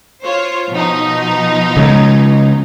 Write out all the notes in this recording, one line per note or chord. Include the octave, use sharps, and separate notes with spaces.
F4 C5 C#5
B2 F3 D#4
C#3 G#3